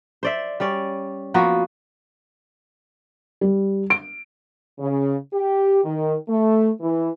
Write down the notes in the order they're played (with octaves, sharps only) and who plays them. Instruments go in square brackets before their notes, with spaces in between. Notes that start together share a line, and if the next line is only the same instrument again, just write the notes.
[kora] C5 D5 E5
G3 C#4 D5
F3 A#3 B3 F#4
[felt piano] G3
D7
[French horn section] C#3
G4
D#3
A3
E3